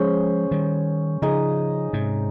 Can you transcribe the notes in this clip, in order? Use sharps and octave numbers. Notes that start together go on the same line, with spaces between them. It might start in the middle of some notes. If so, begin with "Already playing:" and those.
Already playing: F3 G#3 C#4 G#4 C5
D#3 G3
C#3 F3 D#4 G#4 D#5
G#2 C3